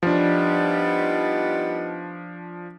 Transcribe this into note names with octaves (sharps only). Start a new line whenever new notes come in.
F3 G3 B3 D4 D#4